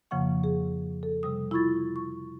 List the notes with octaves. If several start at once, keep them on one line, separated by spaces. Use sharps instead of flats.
F2 C#3 F3 A#3 F#5 C#6
G#4
A4
C3 G3 D#6
E4 F4 B5 C#6 G#6 A6
C#6